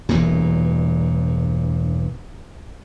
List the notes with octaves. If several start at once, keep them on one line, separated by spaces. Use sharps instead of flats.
E1 E2 G2 A#2